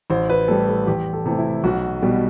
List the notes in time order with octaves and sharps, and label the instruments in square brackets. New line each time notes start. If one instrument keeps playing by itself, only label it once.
[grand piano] A1 C5
B4
A2 G3 A4
A4
E2 G4
A4
C3 E3 A3
E4
B1 F#4
B2 G3